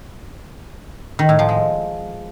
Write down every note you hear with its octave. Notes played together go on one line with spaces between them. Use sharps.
D#3
A2
F3
G#3